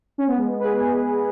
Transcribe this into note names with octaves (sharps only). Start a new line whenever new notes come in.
C#4
B3
G#3
B3
B4
G#4
G#4